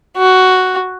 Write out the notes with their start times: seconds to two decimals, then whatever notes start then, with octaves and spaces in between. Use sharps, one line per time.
0.17 F#4